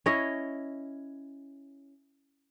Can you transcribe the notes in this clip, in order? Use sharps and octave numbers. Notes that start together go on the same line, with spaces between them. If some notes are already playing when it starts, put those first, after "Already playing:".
C#4 E4 C#5 D#5